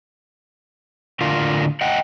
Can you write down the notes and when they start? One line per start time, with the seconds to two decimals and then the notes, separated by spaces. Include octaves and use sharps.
1.21 A2 D3 F4 A#4 F5
1.81 D#5 F#5 G5